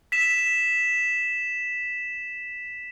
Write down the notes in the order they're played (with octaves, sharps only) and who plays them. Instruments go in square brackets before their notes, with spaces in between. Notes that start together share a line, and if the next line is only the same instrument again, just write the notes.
[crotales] B6 E7